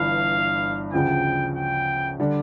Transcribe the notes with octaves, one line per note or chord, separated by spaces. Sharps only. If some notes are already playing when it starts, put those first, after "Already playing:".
Already playing: G1 G2 E3 F5
D2 C#3 F3 G5
G5
D3 G3 D4